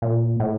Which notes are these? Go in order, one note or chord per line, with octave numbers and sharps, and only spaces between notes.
A#2
A2